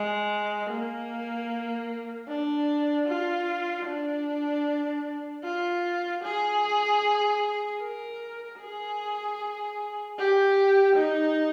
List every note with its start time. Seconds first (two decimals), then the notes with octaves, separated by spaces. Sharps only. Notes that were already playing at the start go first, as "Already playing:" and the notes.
Already playing: G#3
0.71 A#3
2.28 D4
3.08 F4
3.86 D4
5.44 F4
6.24 G#4
7.81 A#4
8.60 G#4
10.18 G4
10.96 D#4